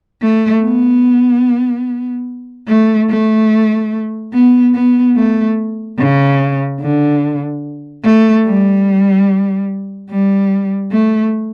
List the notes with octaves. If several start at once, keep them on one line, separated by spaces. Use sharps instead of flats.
A3
B3
A3
A3
B3
B3
A3
C#3
D3
A3
G3
G3
A3